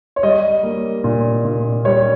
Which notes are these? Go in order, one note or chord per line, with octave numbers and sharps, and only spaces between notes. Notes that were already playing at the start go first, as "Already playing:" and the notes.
C#5
G3 D#5
A#3
A#2
A#2
G3 C#5